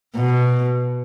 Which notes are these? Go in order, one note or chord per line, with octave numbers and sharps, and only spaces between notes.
B2